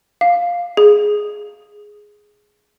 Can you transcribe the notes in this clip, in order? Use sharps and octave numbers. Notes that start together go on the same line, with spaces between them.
F5
G#4